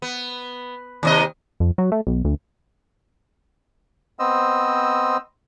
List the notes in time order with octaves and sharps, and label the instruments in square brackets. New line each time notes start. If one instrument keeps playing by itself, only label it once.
[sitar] B3
D#2 C3 D#5
[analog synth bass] F2
F#3
A3
B1
D2
[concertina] B3 C4 C5 D#5 E6